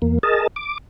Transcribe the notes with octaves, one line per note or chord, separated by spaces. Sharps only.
E2 A#3
G#4 A#4 D#5 A5
D6